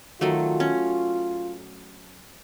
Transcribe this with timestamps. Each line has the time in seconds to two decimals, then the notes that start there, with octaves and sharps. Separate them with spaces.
0.21 D#3 F#3 A3 F4
0.60 C#4